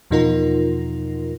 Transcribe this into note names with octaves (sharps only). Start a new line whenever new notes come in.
E2 B2 F3 D#4 F4 A#4